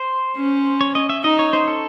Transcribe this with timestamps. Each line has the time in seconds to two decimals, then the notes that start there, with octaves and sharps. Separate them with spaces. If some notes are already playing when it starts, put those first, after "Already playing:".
Already playing: C5
0.37 C#4
0.81 C#5
0.95 D#5
1.09 E5
1.24 D#4 D#5
1.39 C#5
1.53 C5
1.68 A4